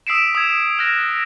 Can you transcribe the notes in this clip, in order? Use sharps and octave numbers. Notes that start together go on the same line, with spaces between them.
D#6 E6 B6 C7 D7 E7
D#6 E6 G#6
F6 F#6 A#6